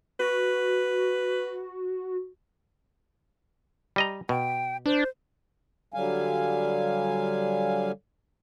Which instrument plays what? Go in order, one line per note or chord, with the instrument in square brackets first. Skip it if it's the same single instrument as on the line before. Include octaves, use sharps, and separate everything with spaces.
[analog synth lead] F#4 [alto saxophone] B4
[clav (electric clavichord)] G3 D#5 A#5
[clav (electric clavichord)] B2 [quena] G5
[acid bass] D4 [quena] C5
[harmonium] D3 F#3 G3 F5 G#5